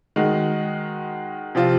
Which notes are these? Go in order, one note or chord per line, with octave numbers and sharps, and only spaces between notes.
D#3 G#3 D#4 F#4
C3 F3 C4 F4